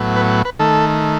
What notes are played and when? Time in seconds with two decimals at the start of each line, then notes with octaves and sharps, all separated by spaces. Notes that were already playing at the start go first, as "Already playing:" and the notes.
Already playing: A2 F#3 B3
0.16 B4
0.45 B4
0.59 D#3 A3 A4